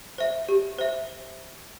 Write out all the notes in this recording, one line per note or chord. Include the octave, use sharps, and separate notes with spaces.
C5 E5
G4
C5 E5